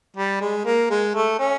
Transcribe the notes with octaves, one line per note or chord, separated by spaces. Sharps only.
G3
G#3
A#3
G#3
A3
C#4